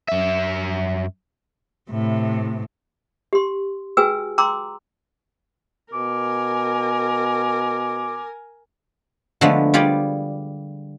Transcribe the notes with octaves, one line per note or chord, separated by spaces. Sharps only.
F#2 E5
A2 C3
G4 C6
F#4 G#4 B4 G5 G#5 E6
G5 A#5 C6 D6 E6
B2 A#4 G#5 D6
D3 F3 G#3 A3 B3
G3 F4 G4 G#4 D5